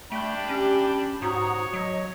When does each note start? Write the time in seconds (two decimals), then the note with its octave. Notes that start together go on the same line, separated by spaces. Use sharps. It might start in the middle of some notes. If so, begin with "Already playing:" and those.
0.12 A3 D4 G5 B5
0.49 C#4 G4
1.22 G#2 F#4 C#5 A#5 D#6
1.73 F#3 D#5